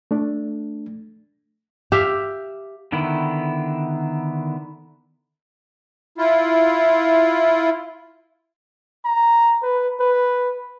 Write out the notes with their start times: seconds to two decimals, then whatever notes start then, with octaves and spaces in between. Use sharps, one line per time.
0.11 A3 D4
1.92 G4 E5 F5 G5
2.92 D3 D#3 B3 E4
6.18 E4 F4
9.05 A#5
9.63 B4
10.00 B4